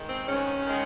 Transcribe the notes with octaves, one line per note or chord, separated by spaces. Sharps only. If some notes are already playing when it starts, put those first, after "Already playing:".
Already playing: D#3 G#3
C4
G#2 D#3 G#3 C#4
D#3 G#3